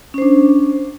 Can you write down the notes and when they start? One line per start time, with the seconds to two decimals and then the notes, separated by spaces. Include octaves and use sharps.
0.14 C#4
0.18 C5
0.22 D4